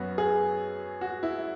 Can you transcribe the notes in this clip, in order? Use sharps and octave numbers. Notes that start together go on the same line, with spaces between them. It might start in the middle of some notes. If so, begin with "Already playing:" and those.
Already playing: F#2 F#3 B3 F#4
G#4
F#4
E4